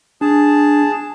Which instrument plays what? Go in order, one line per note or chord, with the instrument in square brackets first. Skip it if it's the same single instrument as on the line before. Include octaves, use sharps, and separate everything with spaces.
[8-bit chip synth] D4 [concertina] G#4 A5